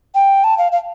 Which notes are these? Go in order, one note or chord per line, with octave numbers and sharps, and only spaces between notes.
G5
A5
F5
F5